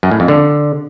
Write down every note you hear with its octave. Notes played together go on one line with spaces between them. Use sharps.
F#2
A2
F2
D3